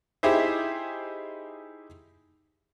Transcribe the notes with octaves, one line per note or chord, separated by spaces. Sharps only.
D#4 E4 G4 G#4 C5 E5